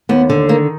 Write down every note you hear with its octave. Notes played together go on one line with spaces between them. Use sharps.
D#2 B3
D3
D#3 A#3